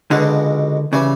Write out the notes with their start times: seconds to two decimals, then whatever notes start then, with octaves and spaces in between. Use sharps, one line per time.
0.11 C#2 B2 D3 G#3
0.93 C#3 E3 G3